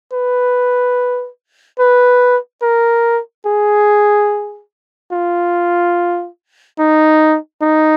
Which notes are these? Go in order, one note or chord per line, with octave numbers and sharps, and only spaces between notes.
B4
B4
A#4
G#4
F4
D#4
D#4